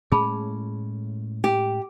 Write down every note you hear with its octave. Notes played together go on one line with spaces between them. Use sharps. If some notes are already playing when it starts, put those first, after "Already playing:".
A2 G#3 C#4 G#4 A5 B5
G4